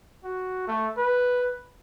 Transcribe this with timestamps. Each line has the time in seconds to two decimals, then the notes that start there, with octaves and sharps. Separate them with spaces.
0.24 F#4
0.67 A3
0.97 B4